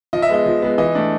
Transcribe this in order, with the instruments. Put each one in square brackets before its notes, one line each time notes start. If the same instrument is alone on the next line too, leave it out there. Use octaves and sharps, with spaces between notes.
[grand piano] F3 D#5
E5
G#3 B3 D#5
F3
G#3 B3
E3 D#5
A3 D4